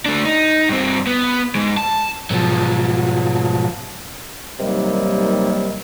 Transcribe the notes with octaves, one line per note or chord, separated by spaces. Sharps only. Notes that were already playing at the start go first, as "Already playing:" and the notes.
A3 D4
D#4
G2 C4
B3
G#2 G#3
A5
G#2 B2 F3 F#3
D#2 C3 D#3 F#3 G3 A#3